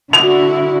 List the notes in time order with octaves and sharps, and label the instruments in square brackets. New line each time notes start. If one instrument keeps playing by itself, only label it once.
[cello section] D3 E4 F#4 [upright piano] F7